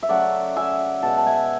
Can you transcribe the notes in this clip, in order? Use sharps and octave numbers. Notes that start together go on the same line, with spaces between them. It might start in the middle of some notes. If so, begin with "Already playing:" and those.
E5
C#3 F#3 A3 D5 F#5
E5 G#5
B2 G#3 F#5 A5
A5
E5 G#5